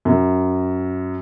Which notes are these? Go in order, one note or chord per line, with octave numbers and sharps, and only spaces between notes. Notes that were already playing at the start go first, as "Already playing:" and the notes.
F#2